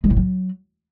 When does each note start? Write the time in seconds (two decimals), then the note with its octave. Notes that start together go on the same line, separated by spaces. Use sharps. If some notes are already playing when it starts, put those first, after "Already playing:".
0.04 G#3
0.10 A2
0.16 F#3